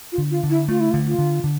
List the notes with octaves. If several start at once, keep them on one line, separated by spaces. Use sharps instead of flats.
F4
D3
F4
D3
E4
A3 F4
E4
F4
D3
F4
D3
D3